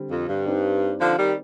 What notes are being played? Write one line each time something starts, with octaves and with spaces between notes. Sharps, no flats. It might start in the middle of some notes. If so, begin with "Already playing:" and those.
Already playing: D3 G3 C4
F2
G2
C4 D#4 G4 D5
D3 F3
D#3 G3